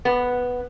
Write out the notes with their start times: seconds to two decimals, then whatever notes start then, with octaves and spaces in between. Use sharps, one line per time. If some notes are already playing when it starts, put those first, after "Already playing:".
0.05 B3